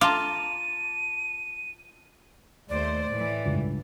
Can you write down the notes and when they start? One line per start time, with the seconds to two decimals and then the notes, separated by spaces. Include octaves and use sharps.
0.01 F4 A5 A#5 D6 D#7
2.69 D#2 A3 C5 D5
3.09 A2 E3
3.46 C#2 G2